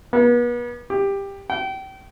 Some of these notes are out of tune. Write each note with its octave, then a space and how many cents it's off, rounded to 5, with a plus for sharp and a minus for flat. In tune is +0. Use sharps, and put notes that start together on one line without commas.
B3 -40
G4 +15
G5 -30